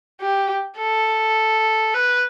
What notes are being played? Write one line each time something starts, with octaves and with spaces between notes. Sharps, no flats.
G4
A4
B4